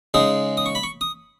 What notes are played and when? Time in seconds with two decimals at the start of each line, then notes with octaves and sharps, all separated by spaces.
0.14 C#3 G#3 D#4 D#6
0.57 D#6
0.66 C#6
0.75 B5
0.83 C#6
1.01 D#6